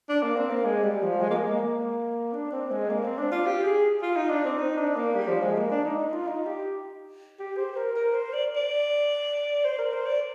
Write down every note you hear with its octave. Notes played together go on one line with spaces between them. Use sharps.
D4
A#3
C4
A#3
G#3
G3
F3
G#3
A#3
G#3
A#3
A#3
D4
C4
G#3
A#3
C4
D4
F4
G4
G#4
F4
D#4
D4
C4
D#4
D4
A#3
G3
F3
G#3
A#3
D4
D#4
D#4
F4
D#4
G4
G4
C5
A#4
A#4
C5
D5
D5
C5
A#4
C5
D5